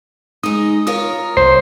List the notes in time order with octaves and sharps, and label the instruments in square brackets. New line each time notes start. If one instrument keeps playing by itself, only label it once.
[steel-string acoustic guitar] G#3 D#4 [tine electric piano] D#6
[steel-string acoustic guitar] F4 A#4 C#5 [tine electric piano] D#6
[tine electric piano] C2 C5 C7